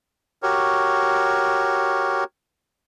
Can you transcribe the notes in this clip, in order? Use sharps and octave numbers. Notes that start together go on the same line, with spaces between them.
F#4 G4 A#4 C#5